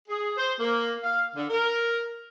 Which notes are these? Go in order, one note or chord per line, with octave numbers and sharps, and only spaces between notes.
G#4
C5
A#3
F5
D3
A#4